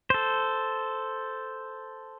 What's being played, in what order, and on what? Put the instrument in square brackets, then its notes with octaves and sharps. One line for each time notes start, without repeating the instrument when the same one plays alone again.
[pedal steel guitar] A4 C5